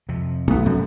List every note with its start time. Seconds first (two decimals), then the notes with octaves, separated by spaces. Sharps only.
0.09 F2 C3 F3
0.48 B1 A3 B3
0.66 F1 A#1 F#2